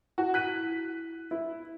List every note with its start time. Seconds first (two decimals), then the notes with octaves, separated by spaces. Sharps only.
0.18 E4 F#4
0.34 F#6 B6 D#7
1.31 E4